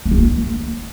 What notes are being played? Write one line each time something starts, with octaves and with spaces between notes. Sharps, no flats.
A#3
A3
A#3